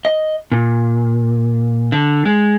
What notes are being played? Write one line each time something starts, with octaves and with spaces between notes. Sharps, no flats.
D#5
A#2
D3
G#3